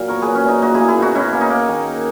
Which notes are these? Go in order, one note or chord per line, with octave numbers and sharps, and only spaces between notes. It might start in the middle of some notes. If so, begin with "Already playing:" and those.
Already playing: A#2 F#3
B3 A#4 C#5
F#3 G#4 B4
C#4
A#2 D#4
A#3 D#4 F#4
A#3 E4 G#4
E4 G#4
B2 D#4 F#4
B2 C#4 E4
A#3
D#4
A#3
D#3